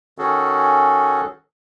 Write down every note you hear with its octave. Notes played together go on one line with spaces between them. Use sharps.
D#3 C#4 F#4 G#4 A4